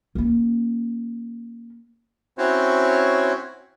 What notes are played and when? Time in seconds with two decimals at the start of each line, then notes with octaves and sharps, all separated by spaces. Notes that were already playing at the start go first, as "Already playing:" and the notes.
0.15 A#3 C#4
2.38 C4 C#4 E4 F#4 C5 C#5